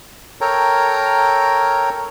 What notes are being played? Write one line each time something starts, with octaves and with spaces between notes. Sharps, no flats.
A4 A#4 C#5 G5 A#5